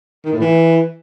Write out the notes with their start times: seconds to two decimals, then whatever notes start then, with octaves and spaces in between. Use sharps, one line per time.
0.24 D#3
0.32 A2
0.40 E3